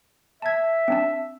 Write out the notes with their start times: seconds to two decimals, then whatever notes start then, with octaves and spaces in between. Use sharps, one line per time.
0.42 E5 A5 G#6
0.88 C4 D4 A5